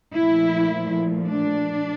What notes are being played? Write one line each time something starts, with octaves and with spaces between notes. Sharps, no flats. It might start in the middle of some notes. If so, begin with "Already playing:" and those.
A#2 F3 A3 E4
D4